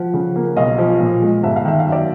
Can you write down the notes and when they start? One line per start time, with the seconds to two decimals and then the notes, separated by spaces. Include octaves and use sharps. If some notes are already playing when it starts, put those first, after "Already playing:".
Already playing: F3 F#5
0.14 C#3
0.36 A#3
0.57 B1 D#5 F5
0.78 F3
1.00 A#2
1.22 G#3
1.43 G1 E5
1.56 F5
1.65 D#3 E5
1.80 F5
1.87 F#2
1.92 D5 E5